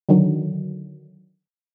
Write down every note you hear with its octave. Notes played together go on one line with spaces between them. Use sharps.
D3 D#3 F#3